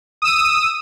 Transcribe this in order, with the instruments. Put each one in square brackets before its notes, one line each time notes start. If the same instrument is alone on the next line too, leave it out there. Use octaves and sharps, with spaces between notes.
[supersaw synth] D#6 E6 D#7